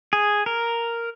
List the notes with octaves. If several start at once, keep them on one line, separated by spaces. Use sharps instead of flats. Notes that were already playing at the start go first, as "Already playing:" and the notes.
G#4
A#4